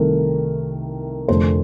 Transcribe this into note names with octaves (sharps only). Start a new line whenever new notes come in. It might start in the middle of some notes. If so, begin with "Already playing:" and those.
Already playing: C2 C3 D#3 A3 A#4
F1 F2 D3 F3 A3 C5